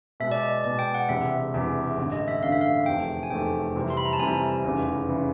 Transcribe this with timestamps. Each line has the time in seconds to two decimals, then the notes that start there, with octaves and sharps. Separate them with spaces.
0.20 B2 G#3 B3 E5
0.32 D5
0.43 D#5
0.64 B2 G#3 B3 D5
0.79 G5
0.94 F#5
1.09 E1 E2 C3 E3 E5
1.54 E1 E2 C3 E3
1.98 A1 G2 D3
2.12 D#5
2.28 E5
2.42 A1 G2 D3 F5
2.52 E5
2.61 F5
2.86 F1 E2 C3 F3 A3 G5
3.23 G#5
3.30 F1 E2 C3 F3 A3 G5
3.76 F2 C3 E3 G3 C4
3.90 C6
3.97 B5
4.05 A#5
4.13 A5
4.19 F2 C3 E3 G3 C4 G#5
4.64 F1 E2 C#3 E3
5.09 C#3 E3